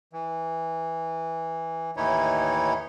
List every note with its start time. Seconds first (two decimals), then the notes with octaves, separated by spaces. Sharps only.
0.13 E3
1.97 D#2 A2 E3 D#4 E4 C#5